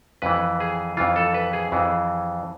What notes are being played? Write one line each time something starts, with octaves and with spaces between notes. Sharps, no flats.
F2 E3 B4
G#4
F2 E3 F4
A4
B4
G#4
F2 E3